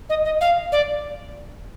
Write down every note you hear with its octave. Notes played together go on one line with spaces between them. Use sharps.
D#5
D#5
F5
D5